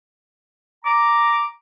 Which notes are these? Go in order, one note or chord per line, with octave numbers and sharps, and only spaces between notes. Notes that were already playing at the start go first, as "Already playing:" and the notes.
A#5 D6